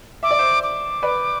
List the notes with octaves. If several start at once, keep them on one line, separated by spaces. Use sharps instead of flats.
E5 D6
D5
C5 E5
D6
B4 D5